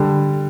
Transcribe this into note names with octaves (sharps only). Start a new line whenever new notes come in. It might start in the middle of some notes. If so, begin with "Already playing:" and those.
Already playing: D3 G3